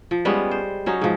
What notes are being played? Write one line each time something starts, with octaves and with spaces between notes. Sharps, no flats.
F3
G3 G#3 B3 C#4
C5
F#3 C#4 D#4
G#2 F3